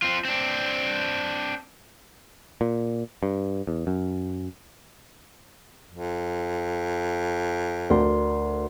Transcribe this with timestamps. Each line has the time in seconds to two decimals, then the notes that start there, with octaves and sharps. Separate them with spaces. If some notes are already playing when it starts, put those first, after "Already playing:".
0.02 C4 F4
0.25 C4 D4
2.61 A#2
3.23 G2
3.67 E2
3.87 F#2
5.91 F2
7.90 D2 A#4 D5 C6